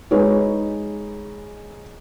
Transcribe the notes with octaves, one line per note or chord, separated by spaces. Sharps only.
G#3 D#4 G#4 B4 C#5